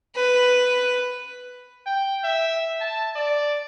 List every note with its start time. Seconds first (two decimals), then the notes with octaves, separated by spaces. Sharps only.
0.15 B4
1.86 G5
2.24 E5
2.81 A5
3.16 D5